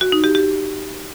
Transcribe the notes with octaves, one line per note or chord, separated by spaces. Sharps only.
F#4
D#4
G4
G4